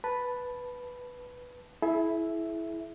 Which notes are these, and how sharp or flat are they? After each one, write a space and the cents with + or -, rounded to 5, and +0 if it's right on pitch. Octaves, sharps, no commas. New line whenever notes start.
B4 +0 A5 +0
E4 +0 G#4 +45 E5 +0